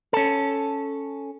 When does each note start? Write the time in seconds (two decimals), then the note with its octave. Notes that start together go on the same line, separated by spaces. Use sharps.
0.13 C#4 A4